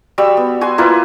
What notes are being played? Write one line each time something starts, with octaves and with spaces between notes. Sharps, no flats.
G3 F#4 E6
B3
F#4 G#5 C6
A#3 E4 F4 B4